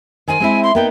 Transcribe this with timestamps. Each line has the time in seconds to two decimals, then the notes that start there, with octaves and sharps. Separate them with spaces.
0.28 D#3 C5 G#5
0.40 G#3 C4 E4
0.63 C6
0.75 A#3 B3 D#4 G5